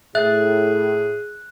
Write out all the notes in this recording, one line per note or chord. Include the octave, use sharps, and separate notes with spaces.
A2 G#4 E5 F#6